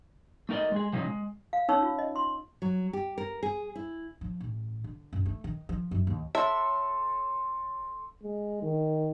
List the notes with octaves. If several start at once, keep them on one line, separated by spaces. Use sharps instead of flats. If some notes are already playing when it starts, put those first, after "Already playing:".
A3 D#4 A#4 D5 D#5
G#3 G#4
C3 F3 F#3 C#4 D#4
G#3
F5
C#4 D#4 C#5 C#6 E6
F4
D#5
C6
F#3
G4
A#4
G#4
E4
F3
A1
D3
F#2
A3
D#3
F3
F#2
D#2
A4 C#5 E5 A5 C6 C#6
G#3
D#3